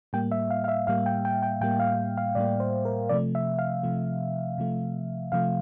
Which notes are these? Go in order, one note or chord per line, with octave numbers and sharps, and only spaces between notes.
A2 G3 A#3 G5
E5
F5
F5
E5
A2 G3 A#3 F5
G5
G5
G5
A2 G3 A#3 G5
F5
F5
A2 G3 A#3 D5
C5
A#4
C3 F3 A3 D5
E5
F5
C3 F3 A3
C3 F3 A3
C3 F3 A3 F5